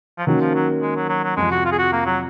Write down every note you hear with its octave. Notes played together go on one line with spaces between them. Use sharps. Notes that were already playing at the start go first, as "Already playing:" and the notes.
F3
D#3 F#3 A#3 C#4 F#4
F3
F#3
G#3
F#3
F#3
F#3
F2 C3 F3 G#3
F#4
F4
G#4
F#4
A#3
F#3